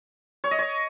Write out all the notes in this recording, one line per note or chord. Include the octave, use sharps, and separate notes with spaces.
C#5
D#5
C#5